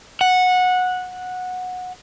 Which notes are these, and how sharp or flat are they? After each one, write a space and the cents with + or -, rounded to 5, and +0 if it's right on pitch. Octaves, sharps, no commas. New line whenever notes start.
F#5 -15